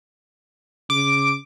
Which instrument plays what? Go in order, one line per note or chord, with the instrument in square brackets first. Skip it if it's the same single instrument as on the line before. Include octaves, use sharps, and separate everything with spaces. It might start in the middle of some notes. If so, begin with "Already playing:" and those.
[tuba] C#3 [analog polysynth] D6